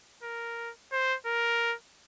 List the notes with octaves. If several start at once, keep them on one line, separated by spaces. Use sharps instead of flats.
A#4
C5
A#4